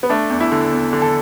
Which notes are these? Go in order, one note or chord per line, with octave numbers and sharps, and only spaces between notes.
B3
A3 D4
E2
E4
D3
E2
D3
A4